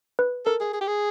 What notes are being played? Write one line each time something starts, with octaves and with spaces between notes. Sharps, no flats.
B4
A4 A#4
G#4
G#4
G4
G#4